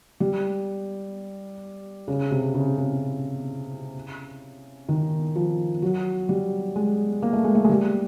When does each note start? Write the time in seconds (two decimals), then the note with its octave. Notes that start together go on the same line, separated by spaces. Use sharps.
0.20 G3
2.08 C#3
2.31 C3
2.54 C#3
2.78 C#3
4.89 D#3
5.36 F3
5.82 F#3
6.29 G3
6.76 G#3
7.22 A#3
7.33 A3
7.44 G#3
7.55 A3
7.64 G#3
7.69 G3